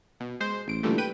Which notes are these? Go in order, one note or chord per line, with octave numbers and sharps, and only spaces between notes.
B2
G#3 C5
A1 D7
A#2 D3 E3 G3 A3
B4 G5 D#7